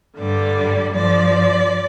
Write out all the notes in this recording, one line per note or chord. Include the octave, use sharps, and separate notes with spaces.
G2 D3 G3 D5
G2 F3 D5